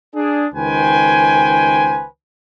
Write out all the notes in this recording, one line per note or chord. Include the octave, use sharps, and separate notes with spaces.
D4 G#4
C#2 D#3 B4 C5 G5 G#5